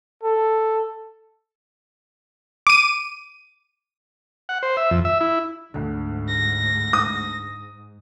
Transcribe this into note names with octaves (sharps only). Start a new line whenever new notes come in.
A4
D6 D#7
F#5
C5
E5
F2
E5
E4
D2 G#2 D3
A#6
D#6